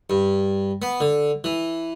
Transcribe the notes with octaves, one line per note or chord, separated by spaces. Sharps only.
G2
B3
D3
E3